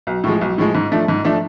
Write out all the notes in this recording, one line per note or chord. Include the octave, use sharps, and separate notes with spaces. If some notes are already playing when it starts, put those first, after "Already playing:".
B1
A2 F3 G#3
B1
A2 F3 G#3
G#2
F3 A3 D4
G#2
F3 A3 D4